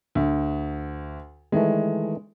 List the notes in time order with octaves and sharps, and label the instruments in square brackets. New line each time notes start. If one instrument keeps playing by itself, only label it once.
[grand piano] D2
[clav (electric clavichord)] D#3 E3 A3 [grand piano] G#3